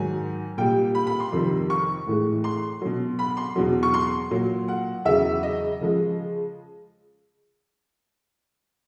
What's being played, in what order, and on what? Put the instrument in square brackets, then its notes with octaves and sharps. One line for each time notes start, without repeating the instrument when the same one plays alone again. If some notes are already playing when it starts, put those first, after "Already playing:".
Already playing: [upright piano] G#2 D#3 F#3 G#5
A#2 G3 G5
B5
B5
C6
F2 C3 D#3 G3
C#6
A2 E3 G#3
C6
B2 F#3
B5
C6
E2 B2 F#3
C#6
C6
A#2 F#3
F#5
E2 C#3 F#3 E5
D#5
C#3 F3 G#3